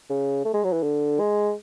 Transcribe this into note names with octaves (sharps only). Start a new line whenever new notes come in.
C#3
A3
G#3
F#3
E3
D3
G#3